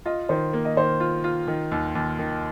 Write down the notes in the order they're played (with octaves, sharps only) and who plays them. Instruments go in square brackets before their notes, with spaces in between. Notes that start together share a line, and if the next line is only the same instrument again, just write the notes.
[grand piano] F4 [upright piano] D#5
[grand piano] D#3 [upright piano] C5
[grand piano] A#3
[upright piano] D#5
[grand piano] D#3 [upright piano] C5
[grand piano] F4
F4
D#3
D#2
D#2
D#3